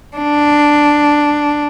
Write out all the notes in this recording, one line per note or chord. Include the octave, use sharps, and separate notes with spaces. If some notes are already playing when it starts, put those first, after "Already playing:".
D4